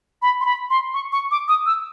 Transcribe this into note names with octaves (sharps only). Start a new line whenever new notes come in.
B5
C6
B5
C6
C#6
C#6
D6
D#6
E6